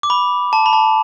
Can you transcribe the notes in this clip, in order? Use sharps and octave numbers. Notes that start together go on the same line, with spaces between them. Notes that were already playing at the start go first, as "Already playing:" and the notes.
D6
B5
A5
B5
A5